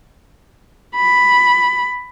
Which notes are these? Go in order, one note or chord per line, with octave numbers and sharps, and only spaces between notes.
B5